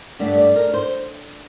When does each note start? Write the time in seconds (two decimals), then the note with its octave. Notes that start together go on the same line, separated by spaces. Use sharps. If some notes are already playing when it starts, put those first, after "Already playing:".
0.19 G2 D3 A3 D5
0.38 D5
0.56 A#4
0.74 C5